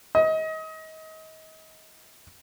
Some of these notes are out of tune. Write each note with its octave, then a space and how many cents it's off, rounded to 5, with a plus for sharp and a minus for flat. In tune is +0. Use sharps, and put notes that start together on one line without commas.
D#5 +30